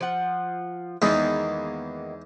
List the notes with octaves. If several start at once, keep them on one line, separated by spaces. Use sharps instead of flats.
F3 F#5
E2 D#3 G#3 A#3 B3 D#4